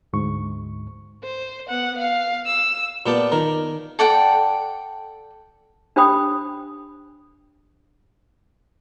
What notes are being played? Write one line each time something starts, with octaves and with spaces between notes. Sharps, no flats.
D2 G#2 C#6
C5
B3 F#5
F5
E6
A#2 B3 G4 D5 A5
D#3 A#4
A4 D5 F#5 G5
D4 G4 C5 G5 B5 D#6